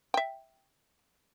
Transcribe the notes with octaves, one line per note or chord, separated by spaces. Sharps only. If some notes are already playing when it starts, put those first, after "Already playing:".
E5 G5